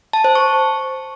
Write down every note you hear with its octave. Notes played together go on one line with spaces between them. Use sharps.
A5
C5
C#6